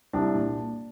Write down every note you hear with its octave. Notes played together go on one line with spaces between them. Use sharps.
C2 D4
A#2